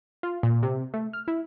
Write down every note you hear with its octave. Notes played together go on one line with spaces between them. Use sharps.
F4
A#2
C3
A3
F6
E4